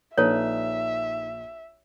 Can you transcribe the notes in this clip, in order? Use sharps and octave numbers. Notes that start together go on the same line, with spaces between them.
A#1 D#4 A4 B4 C#5 E5